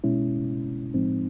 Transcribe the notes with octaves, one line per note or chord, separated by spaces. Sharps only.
B2 G#3 C#4 E4
A2 F3 G#3 C4 D#4